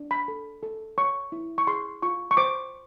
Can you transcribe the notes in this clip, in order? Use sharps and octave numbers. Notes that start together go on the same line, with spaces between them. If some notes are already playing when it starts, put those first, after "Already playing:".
Already playing: D4
B5
A4
A4
C#5 C#6
E4
C#6
G#4 C6
F4 C#6
C#6
C5 D6